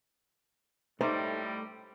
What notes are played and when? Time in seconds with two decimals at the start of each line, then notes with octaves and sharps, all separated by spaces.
1.01 A2 G3 A3 D#4 C5